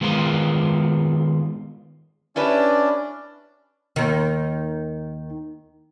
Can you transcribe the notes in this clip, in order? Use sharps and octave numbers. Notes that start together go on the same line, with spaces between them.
D#3 G#3 B3 F4 A#4 C5
C#4 D4 E4 G4 B4 D5
D#2 D#3